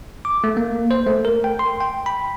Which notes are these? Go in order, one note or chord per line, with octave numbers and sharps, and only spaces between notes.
D6
A3
A#3
C5
A3
A#4
G5
C6
G5
B5